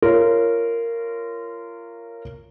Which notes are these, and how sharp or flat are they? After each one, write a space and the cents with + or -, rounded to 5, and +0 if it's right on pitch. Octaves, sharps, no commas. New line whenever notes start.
F4 -25 A#4 -10 C#5 +0